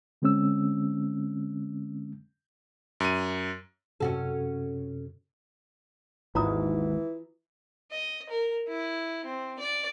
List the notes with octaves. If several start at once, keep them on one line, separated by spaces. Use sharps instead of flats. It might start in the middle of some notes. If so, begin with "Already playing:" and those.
D3 G#3 C4 C#4 E6
F#2 D#7
F#2 C3 C#4 F#4 A4
G#1 D#2 G#2 E3 F4 A#5 D#6
D#5
A#4
E4
C4
D5